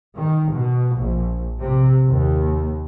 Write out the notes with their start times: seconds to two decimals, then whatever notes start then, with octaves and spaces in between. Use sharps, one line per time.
0.16 D#3
0.52 B2
0.97 A#1
1.61 C3
2.08 D#2